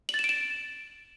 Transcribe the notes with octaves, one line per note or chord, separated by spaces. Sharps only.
F#7
A6
E7
D7
E7